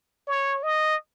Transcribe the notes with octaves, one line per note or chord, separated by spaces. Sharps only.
C#5
D#5